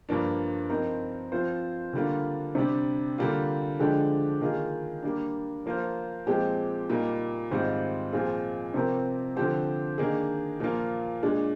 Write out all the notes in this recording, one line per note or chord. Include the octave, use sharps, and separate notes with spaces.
G2 F3 A#3 D4
F3 C4 D#4 A#4
F3 C4 F4 C5
D3 G3 A#3 D4 F4
C3 G3 D4
D3 G3 A#3 F4
D3 F3 G#3 D4 G4
D#3 A#3 F4 G#4
G3 A#3 D4
F3 A#3 F4 C5
A#2 F3 G#3 C4 G4
A#2 G3 A#3 D#4
G#2 D#3 G3 C4 F4
A#2 F3 C4 F4 G#4
C3 F3 C4 G4 A#4
D3 F3 C4 G4 C5
D#3 A#3 D4 G#4
A#2 F3 A#3 F4
A#2 G#3 D4